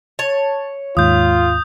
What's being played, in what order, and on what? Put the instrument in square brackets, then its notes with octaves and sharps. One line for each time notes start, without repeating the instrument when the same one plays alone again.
[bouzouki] C#5 [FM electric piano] A5
[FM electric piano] D#2 G#2 [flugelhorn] F4 [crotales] D#6 G6